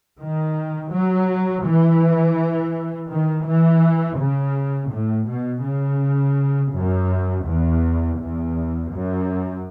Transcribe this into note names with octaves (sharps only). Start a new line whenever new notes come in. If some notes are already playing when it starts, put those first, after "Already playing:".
D#3
F#3
E3
D#3
E3
C#3
A2
B2
C#3
F#2
E2
E2
F#2